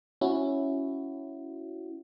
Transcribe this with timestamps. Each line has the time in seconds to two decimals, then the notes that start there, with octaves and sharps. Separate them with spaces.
0.21 C#4 E4 F#4